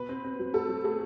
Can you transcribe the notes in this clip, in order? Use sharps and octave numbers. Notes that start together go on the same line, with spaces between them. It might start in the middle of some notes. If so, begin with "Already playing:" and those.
Already playing: B2 B4
C4
C4
F#3
A3 A4
F#3
A3 G#4